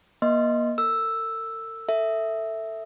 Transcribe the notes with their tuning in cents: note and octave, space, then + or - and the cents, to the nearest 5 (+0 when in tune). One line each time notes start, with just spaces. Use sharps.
A#3 +35 D#5 +0 C6 +0
A4 +45 E6 +0
A4 +15 E5 +0